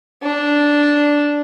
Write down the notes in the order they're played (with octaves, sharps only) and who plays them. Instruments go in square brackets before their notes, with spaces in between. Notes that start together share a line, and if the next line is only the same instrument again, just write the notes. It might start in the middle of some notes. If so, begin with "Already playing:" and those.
[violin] D4